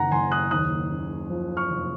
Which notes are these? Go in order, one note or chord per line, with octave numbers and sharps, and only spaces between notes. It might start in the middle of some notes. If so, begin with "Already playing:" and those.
Already playing: F#1 F#2 D#3 F#5 A#5
F#1 G#5 C6
D#6 F#6
D#2 D#6 F#6
C#3
F3
C#6 F6
F1